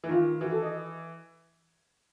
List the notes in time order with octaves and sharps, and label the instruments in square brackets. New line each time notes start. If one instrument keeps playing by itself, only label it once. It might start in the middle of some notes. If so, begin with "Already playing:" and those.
[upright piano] E3
[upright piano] D#3 [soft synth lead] F4
[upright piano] E3 [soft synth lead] F#4
[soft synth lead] A4
D#5